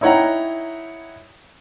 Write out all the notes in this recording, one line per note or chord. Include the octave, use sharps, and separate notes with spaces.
D#4 E4 C#5 F#5 G5 A#5